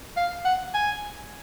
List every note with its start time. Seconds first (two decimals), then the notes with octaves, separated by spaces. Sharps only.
0.17 F5
0.45 F#5
0.74 G#5